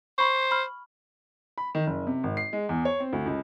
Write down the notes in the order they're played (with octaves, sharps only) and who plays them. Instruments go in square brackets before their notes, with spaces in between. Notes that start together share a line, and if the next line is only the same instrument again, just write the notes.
[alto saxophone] C5 [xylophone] B5 C#6
[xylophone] B5 F6
[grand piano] B5
D#3
F#1
C3
G#1
C7
G#3
E2
C#5
C4
D2
C#2